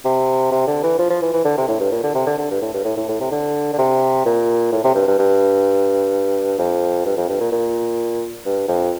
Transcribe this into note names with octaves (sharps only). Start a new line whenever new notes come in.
C3
C3
D3
E3
F3
F3
E3
E3
D3
C3
A2
G2
A#2
D3
C3
D3
D3
G2
A2
G2
A2
A2
A2
C3
D3
D3
C3
A#2
A2
C3
G2
G2
G2
F2
G2
F2
G2
A#2
A#2
G2
F2